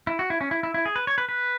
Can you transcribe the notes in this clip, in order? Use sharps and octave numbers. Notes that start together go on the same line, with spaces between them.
E4
F#4
E4
C#4
E4
E4
E4
G#4
B4
C#5
B4
B4